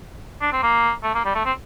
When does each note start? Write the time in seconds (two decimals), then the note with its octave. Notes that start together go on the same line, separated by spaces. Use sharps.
0.41 D4
0.53 C4
0.63 A#3
1.03 A3
1.14 A#3
1.25 G3
1.35 A3
1.45 C4